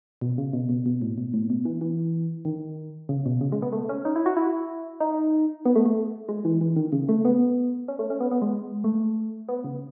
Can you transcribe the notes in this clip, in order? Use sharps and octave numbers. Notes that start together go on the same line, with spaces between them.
B2
C#3
B2
B2
B2
A2
B2
A2
B2
E3
E3
D#3
C#3
B2
C#3
G#3
B3
A3
C#4
D#4
E4
F#4
E4
D#4
B3
A3
A3
G#3
E3
E3
D#3
C#3
A3
B3
C#4
A3
C#4
B3
B3
G#3
A3
B3
C#3